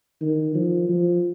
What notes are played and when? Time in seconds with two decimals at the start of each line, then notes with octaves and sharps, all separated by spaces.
0.21 D#3
0.55 F3
0.89 F3